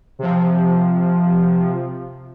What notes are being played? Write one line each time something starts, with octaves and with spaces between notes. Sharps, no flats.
C3 F3